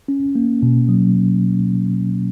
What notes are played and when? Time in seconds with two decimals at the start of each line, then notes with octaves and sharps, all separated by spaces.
0.08 C#4
0.35 A#3
0.63 B2
0.89 F#3